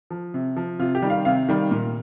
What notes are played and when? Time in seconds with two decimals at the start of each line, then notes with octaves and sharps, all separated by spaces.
0.10 F3
0.34 C3
0.57 F3
0.79 C3 F4
0.95 G4
1.02 D#3 G3
1.10 F5
1.25 C3 F5
1.49 D#3 G3
1.71 A#2